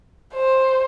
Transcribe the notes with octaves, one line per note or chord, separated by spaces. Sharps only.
C5